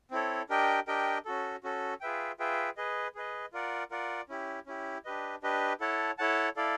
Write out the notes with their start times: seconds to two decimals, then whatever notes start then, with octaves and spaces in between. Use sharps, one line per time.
0.11 C4 E4 A4 C#5
0.49 D4 G4 A#4 D#5 G5
0.87 D4 G4 A#4 D#5 G5
1.25 C#4 F#4 A4
1.63 C#4 F#4 A4
2.01 F4 G#4 B4 E5 G5
2.39 F4 G#4 B4 E5 G5
2.77 G#4 B4 D#5
3.15 G#4 B4 D#5
3.53 F4 A#4 D5 F#5
3.91 F4 A#4 D5 F#5
4.29 C#4 E4 G4
4.66 C#4 E4 G4
5.05 D4 G4 B4 D#5
5.43 D4 G4 B4 D#5
5.80 E4 A4 C#5 F#5 A5
6.18 E4 A4 C#5 F#5 A5
6.56 E4 A4 D5 F5